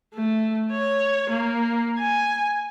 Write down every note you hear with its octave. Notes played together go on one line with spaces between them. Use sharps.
A3
C#5
A#3
G#5